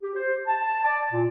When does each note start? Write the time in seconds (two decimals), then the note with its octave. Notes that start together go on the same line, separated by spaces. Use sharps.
0.02 G4
0.15 C5
0.47 A5
0.84 D5
1.11 A#2